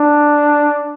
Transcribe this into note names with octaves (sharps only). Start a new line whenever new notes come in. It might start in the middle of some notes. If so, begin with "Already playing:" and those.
Already playing: D4